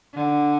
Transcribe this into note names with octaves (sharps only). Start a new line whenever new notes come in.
D3